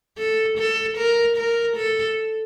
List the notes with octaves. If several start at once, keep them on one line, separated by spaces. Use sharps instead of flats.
A4
A4
A#4
A#4
A4